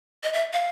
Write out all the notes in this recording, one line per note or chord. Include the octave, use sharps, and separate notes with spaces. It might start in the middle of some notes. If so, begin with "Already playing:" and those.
D#5
E5
F5